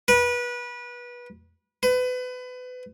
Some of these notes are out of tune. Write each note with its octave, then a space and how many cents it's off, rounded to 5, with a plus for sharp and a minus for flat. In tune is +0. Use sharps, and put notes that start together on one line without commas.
B4 -25
B4 +30